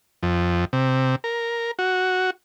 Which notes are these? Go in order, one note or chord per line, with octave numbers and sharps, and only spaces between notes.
F2
C3
A#4
F#4